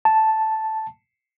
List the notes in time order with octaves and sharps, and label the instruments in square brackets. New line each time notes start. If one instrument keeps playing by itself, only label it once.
[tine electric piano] A5